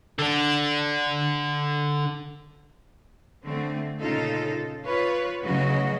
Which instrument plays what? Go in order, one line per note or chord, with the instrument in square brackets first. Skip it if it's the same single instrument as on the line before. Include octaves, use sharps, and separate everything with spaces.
[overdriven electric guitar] D3 D4
[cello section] D3 A3 C4
A#2 C#3 D#4 F4 A4
F4 B4 C#5
D2 C#3 E3 F#3 F#4 D#5